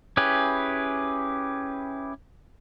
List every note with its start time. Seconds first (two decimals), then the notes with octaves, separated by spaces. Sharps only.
0.17 C#4 E4 G4 G#4 B4